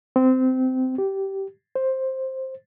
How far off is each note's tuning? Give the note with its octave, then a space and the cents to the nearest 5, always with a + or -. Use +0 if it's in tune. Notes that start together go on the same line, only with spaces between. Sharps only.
C4 -20
G4 -15
C5 +10